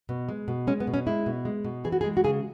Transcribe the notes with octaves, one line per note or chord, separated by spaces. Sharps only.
B2
G#3
B2
G#3 C#4
B3
B2
C#4
G#3 E4
B2
G#3
B2
E3 G#4
F#4
G#4
G#3
F#4
C#3 G#4